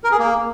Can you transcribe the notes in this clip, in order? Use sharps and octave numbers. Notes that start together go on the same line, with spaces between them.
A#4
G#4
A#3